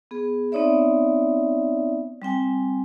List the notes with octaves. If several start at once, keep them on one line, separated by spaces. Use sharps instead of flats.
B3 G#4
B3 C4 D#4 C#5 D5 E5
G3 C4 G5 G#5